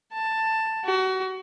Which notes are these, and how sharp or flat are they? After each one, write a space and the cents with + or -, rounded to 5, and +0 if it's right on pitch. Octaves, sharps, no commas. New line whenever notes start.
A5 +10
F#4 +30